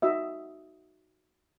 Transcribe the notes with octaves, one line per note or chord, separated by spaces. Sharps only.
D#4 F#4 D#5 E5